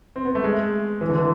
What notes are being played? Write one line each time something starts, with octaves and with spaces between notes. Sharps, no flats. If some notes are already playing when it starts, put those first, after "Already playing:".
C4
B3
A3
G#3
E3
D3
E3